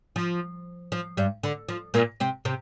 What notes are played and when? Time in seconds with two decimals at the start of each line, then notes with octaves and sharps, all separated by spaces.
0.16 F3
0.92 F3
1.17 G2 G3
1.43 D3
1.69 F3
1.94 A#2 A#3
2.20 C3 C4
2.45 C3 C4